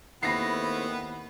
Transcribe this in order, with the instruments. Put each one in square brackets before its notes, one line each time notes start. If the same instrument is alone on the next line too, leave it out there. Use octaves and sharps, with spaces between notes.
[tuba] D#2 [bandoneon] A3 C4 E4 [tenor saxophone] B3 [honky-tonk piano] B5 A#6 C7